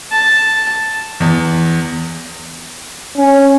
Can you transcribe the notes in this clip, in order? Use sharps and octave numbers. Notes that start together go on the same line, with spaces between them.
A5
E2
C#4